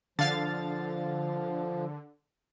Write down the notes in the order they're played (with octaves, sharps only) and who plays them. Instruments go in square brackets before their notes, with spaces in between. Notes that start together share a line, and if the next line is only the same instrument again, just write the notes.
[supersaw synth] D3 [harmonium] F3 [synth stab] F5 A6